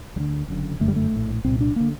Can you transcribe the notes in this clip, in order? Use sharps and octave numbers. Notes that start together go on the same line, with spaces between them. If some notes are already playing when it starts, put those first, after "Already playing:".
D2 D3 G3
F#1 F#2 D3
G1 F#2 D3 A3
G3
A3
A#1 A2
C2 A#2 C4
D4
D3 A#3